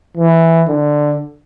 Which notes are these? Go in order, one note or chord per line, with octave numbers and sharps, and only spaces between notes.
E3
D3